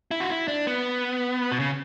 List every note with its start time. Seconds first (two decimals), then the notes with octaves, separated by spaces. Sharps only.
0.11 E4
0.20 F#4
0.30 E4
0.48 D4
0.67 B3
1.52 B2
1.59 C#3